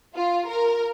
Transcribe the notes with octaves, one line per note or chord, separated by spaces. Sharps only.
F4
A#4